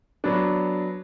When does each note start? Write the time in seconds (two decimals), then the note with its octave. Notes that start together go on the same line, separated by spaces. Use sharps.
0.24 F#3 B3 D4